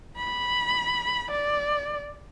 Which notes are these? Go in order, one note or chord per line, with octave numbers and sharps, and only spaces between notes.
B5
D5